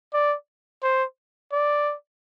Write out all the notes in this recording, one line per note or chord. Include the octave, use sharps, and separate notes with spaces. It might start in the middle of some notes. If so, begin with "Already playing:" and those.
D5
C5
D5